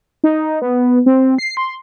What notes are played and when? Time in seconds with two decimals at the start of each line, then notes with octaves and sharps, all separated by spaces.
0.24 D#4
0.62 B3
1.06 C4
1.38 C7
1.57 C6